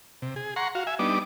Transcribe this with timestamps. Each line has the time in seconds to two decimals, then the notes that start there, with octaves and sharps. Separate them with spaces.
0.22 C3
0.36 G#4
0.56 F#5 A#5 C6 C#6
0.75 F#4 F5
0.87 E5 G#5
0.99 G3 B3 D4 D#4 D6